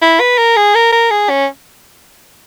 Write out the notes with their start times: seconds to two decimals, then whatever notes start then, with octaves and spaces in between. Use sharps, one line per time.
0.02 E4
0.20 B4
0.38 A#4
0.56 G#4
0.75 A#4
0.92 A#4
1.11 G#4
1.29 C#4